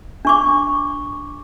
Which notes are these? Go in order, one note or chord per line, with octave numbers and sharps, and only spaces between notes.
D4 C#6 D6